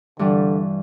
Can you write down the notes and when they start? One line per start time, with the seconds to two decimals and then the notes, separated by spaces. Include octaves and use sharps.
0.19 G2 D3 E3 G3